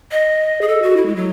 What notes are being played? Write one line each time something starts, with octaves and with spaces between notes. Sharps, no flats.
D#5
G#4
A4
F#4
E4
G#3
F#3